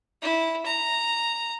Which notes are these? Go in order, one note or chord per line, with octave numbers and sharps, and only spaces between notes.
E4
A#5